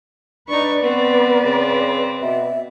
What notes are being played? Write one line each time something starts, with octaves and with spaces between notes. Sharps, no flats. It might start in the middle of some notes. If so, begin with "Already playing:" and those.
D4 D#4 B4 D5 C#6
B3 C4
C#3 C4
B2 E5